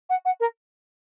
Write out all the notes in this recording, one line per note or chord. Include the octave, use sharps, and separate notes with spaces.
F#5
F#5
A#4